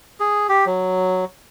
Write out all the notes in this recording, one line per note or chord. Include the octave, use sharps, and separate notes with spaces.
G#4
G4
F#3